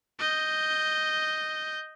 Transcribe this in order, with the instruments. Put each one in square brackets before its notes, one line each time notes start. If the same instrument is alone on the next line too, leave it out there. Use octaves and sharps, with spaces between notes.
[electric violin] D#5 G6